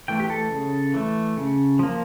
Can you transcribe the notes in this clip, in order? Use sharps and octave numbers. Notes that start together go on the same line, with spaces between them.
E3 A3 G5
G4
A4
C#3
E3 A3
C#3
F3 A#3